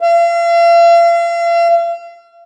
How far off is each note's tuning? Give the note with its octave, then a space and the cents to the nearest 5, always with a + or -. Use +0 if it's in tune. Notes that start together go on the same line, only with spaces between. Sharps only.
F5 -40